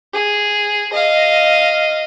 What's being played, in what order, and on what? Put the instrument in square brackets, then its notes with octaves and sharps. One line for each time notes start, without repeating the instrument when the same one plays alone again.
[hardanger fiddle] G#4
D#5 F5